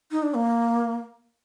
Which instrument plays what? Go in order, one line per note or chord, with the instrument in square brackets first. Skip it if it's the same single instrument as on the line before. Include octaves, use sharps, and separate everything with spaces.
[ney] D#4
D4
A#3